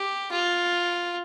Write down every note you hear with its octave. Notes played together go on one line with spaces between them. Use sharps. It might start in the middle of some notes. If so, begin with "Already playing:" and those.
Already playing: G4
F4